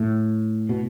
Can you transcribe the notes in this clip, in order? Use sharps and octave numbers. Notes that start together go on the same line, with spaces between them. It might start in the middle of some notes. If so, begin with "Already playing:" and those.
Already playing: A2
B2